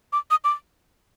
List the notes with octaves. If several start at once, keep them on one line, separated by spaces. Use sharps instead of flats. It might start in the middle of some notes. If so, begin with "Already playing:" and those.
D6
D#6
D6